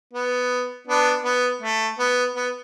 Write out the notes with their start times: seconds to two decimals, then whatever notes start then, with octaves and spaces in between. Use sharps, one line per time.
0.13 B3
0.87 B3 D4
1.24 B3
1.62 A3
1.99 B3
2.36 B3